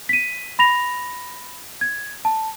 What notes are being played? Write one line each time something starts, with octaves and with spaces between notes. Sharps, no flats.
B6 D#7
B5 A#6 F7
G#6
A5